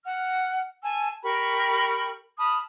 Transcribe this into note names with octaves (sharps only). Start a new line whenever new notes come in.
F#5 F6
G#5 A5 E6
G4 A#4 B5 C#6
A5 B5 D#6 F6